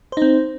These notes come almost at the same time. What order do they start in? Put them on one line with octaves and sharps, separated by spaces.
C5 D#4 C4